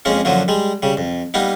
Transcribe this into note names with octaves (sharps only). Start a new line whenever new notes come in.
F2 G#3 A#3 C#4
F#2 D3 F3 F#3 A#3
G3 G#3
C#3 G3
F2
G3 A#3 B3 D#4